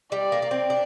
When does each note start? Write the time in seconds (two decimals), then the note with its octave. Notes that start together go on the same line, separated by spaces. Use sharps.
0.12 G3 D5
0.32 A#3
0.42 A#3
0.51 C4
0.70 D4